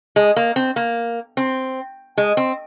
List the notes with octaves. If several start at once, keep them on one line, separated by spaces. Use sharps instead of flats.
G#3
A#3
C4
A#3
C4
G#3
C4